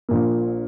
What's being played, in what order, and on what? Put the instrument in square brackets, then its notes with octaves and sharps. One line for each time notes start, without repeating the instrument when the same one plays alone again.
[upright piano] A#1 A#2 A#3